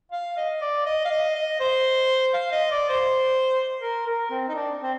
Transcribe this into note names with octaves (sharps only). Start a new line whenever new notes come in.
F5
D#5
D5
D#5
F5
D#5
D#5
C5
F5
D#5
D5
C5
A#4
A#4
C4
D#4
D4
C4